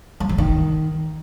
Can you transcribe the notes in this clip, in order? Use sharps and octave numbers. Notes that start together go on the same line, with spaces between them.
F#3
F3
D#3